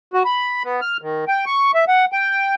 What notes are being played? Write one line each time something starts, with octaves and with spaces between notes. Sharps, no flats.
F#4
B5
B3
F6
D#3
G5
C#6
E5
F#5
G5